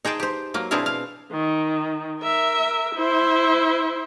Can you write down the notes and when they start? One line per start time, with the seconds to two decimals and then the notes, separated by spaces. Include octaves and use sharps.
0.05 D#4 G#4 C5 G5 A5
0.20 G4 C5
0.54 F#3 A#3
0.71 B2 C4 D4 E4 G#4 F5
0.86 F5
1.32 D#3
2.20 A#4 E5
2.95 E4 C5